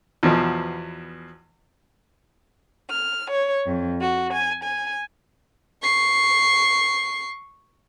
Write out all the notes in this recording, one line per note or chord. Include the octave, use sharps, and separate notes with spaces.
E2 B2 F3
F6
C#5
F2
F#4
G#5
G#5
C#6 C7